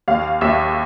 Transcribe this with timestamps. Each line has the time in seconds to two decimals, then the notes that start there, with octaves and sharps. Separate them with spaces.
0.08 D#2 F5
0.41 D#2 E5